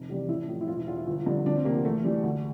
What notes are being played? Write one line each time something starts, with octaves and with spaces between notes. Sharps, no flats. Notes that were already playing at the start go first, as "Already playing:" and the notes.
Already playing: F1
E2 C3 G3
A1 E4
A2 F3
E4
E1 F4
E4
E2 E3 F4
E4
G1
G2 D3 F3
D2 D4
C4
C3 F3 A#3
E2 A3
E3 G3
D2